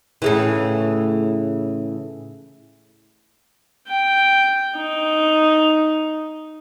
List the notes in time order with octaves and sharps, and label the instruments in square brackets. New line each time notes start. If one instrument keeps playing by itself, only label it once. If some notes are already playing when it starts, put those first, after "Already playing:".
[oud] A2 C#3 E3
[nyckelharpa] G5
D#4